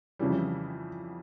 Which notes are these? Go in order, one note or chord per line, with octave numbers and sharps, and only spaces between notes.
F2 C#3 E3 G3